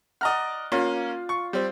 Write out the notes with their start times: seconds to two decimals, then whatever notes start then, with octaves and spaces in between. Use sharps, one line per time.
0.21 D5 D#5 F#5 A#5 F6
0.72 A#3 C#4 F4
1.29 C#6
1.53 G3 C4